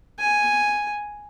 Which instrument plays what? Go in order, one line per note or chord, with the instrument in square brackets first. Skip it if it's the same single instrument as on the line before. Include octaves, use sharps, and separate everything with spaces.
[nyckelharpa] G#5